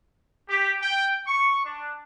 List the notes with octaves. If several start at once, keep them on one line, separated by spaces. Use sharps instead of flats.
G4
G5
C#6
D4